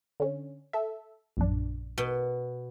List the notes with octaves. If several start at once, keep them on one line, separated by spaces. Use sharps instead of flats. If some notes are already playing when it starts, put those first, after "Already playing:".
D3 C#4
A4 E5
A#1 F#2 D4
B2